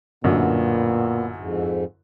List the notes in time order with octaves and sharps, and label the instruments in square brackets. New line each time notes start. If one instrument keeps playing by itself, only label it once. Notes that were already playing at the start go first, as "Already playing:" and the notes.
[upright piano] A1 F#2 D3 [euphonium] A#2 [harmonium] B3
[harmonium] F2 G#2